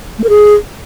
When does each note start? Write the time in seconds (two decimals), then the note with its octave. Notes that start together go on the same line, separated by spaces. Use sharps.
0.18 A3
0.24 A#4
0.29 G#4